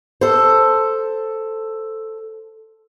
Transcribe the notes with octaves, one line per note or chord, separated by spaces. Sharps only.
A4 C5